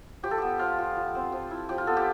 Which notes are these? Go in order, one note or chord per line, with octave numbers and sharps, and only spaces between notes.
F3 G4
A4
B3 G4
F3 F4
F4
F3
C4
F3
E4
F3 G4
F4
B3 A4
G4